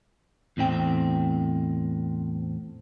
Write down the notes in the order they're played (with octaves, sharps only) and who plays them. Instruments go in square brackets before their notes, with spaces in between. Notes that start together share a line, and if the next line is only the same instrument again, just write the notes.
[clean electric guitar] E2 A2 C4 G5